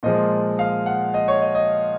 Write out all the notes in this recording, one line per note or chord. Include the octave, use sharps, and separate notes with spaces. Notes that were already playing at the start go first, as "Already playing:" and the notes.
A#2 F3 G#3 D#5
F5
F#5
D#5
C#5
D#5
D#5